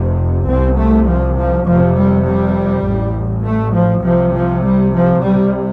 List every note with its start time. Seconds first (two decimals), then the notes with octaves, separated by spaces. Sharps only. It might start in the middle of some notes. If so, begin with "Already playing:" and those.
Already playing: F1 F2 C3
0.47 C2 C3 C4
0.77 A3
1.07 F3
1.37 F3
1.67 F1 F2 C3 F3
1.96 G3
2.26 G3
2.85 A1 A2
3.45 A3
3.74 F3
4.04 C2 C3 F3
4.34 F3
4.64 G3
4.94 F3
5.23 C2 C3 G3